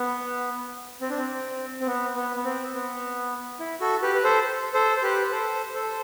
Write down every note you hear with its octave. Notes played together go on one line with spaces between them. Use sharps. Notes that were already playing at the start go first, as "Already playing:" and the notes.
Already playing: B3
C4
D4
C4
C4
B3
B3
B3
C4
B3
E4
F#4 A4
G4 B4
B4
A4 C5
A4 C5
C5
G4 B4
B4
A4 C5
A4 C5